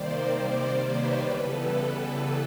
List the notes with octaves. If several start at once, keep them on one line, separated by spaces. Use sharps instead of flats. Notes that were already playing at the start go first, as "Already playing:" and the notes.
Already playing: C3 D#3 G3 A#3 C5 D5
B4 C#5
C#3 E3 G3 B3 A4 B4